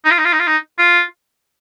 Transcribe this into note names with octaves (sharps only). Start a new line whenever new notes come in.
D#4
F4
D#4
F4
D#4
F4
D#4
F4